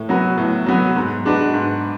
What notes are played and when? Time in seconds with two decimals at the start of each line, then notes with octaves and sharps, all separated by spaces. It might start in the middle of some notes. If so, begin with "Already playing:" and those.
Already playing: A2
0.09 F#3 B3 F#4 B4
0.38 A2
0.66 F#3 B3 F#4 B4
0.96 G#2
1.25 G#3 D4 F#4 B4
1.54 G#2